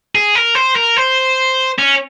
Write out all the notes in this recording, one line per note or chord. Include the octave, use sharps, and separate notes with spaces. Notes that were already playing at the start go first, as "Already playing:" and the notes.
G#4
A#4
C5
A#4
C5
C#4